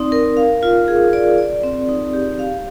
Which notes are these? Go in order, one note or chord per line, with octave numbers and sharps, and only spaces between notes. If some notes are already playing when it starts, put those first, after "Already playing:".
Already playing: C4 D#4 D5
A#4
F5
F4
G#4
D5
D5
C4
D#4
G4
F5